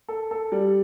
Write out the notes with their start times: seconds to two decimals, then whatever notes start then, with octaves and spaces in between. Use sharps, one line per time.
0.08 A4
0.31 A4
0.52 G3